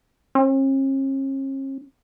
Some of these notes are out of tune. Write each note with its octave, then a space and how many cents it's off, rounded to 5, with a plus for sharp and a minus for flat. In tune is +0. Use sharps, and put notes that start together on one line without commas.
C#4 -45